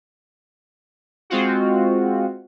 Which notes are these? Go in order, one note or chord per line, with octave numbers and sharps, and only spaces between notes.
G#3 C4 F4 F#4